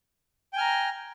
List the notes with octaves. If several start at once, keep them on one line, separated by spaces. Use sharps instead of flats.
G5 G#5 A#5 F6